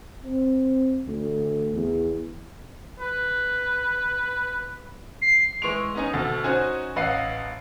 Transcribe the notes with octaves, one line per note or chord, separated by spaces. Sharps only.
C4
D2
E2
B4
C7
E3 G#3 C6 C#6 D7 F7
B3 C#4 D#4 G#5
D2 B2 A4 A6
C#4 D#4 F#4 C5 G#5
A1 B4 D#5 F5 F#5 C7